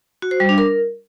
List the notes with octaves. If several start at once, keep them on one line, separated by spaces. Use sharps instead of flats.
F#4
C5
G3
D4
A#4